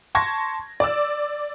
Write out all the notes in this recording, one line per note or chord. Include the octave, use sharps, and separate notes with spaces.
A5 C6 C#6 G#6 A#6
D5 D6 E6